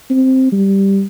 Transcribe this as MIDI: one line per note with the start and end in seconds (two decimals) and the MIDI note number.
0.10 0.49 60
0.52 1.05 55